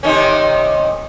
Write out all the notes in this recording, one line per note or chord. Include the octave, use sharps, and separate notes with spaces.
C3 D#3 C#4